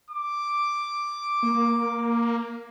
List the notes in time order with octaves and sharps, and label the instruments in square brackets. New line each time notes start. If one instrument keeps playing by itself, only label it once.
[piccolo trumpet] D6
[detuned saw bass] A#3